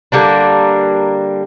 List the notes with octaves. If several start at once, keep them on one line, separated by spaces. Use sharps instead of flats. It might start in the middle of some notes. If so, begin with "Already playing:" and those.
D3 G3 A#3 D4